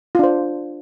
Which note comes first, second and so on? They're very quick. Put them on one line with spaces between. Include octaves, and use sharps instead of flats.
F4 D4 C5